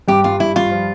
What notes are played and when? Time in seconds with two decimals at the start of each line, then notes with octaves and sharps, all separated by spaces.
0.08 G2 G4
0.24 G2 F4
0.40 G2 E4
0.56 G2 F4
0.71 F3